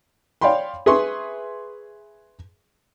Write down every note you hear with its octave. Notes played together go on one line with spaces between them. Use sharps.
C#5 D5 F5 G5 B5 C6
G#4 B4 E5 C6 C#6